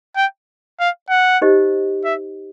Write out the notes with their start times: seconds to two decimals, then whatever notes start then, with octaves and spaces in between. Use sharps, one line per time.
0.17 G5
0.80 F5
1.10 F#5
1.42 D#4 G4 C5 D#5
2.05 E5